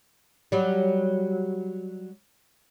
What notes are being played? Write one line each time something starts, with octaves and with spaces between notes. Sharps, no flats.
F#3 G3